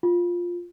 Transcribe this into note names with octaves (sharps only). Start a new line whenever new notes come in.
F4